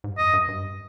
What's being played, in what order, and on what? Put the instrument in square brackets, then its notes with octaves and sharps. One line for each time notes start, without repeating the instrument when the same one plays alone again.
[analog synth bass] G#2
G2
[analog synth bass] F2 [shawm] D#5
[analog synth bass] G2
G2